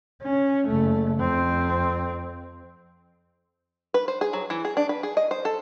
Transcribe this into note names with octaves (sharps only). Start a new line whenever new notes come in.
C#4
F#1 A3
F2 C4
B4
C5
G#4
F#3
E3
G#4
D4
B4
G#4
D#5
C5
A4